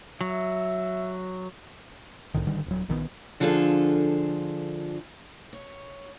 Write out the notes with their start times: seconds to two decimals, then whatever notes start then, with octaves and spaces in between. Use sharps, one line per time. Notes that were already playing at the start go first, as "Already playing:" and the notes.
0.21 F#3 E5
2.34 C2 A2 D#3
2.47 G#1 D3 D#3 G3
2.66 D#1 F#3
2.88 A#1 D#3 E3 B3
3.40 D3 F3 D4 F4 G#4 A4
5.53 C#5